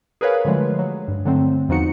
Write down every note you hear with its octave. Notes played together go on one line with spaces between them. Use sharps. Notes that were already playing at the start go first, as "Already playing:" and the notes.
G#4 A#4 B4 C#5 F5
D3 F3 F#3 G#3 A3
F#3
G2
D3 F#3 A3 C4
E2 F3 D#4 F#4 C#7